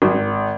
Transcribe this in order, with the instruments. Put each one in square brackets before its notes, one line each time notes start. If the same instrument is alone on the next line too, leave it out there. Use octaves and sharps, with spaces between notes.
[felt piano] G#1